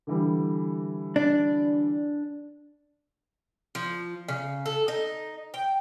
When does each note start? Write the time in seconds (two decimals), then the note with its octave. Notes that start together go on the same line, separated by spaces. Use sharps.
0.07 D3 E3 G3
1.16 D4
3.75 F3
4.28 C#3
4.66 A4
4.88 D#4
5.54 G5